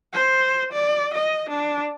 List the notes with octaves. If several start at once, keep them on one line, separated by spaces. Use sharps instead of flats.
C5
D5
D#5
D4